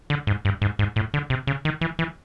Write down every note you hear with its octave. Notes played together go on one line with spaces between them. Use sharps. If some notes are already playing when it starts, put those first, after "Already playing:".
D3
G#2
G2
G#2
G#2
A2
D3
C3
C#3
D#3
E3
E3